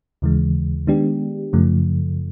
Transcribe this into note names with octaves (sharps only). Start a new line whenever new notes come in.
D#2 C#3 E3 G#3
D#3 G#3 B3 D4 G4
F#2 C#3 F3 A3